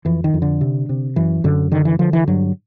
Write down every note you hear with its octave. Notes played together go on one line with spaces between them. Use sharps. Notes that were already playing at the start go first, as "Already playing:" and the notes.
F2 E3
D#3
F2
D3
C3
C3
F#2 E3
F#2 D3
D3 D#3
E3
D3 F3
E3
G2 F#3